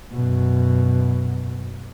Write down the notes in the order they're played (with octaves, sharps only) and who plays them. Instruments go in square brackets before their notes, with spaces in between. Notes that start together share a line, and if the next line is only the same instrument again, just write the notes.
[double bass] F#2 B2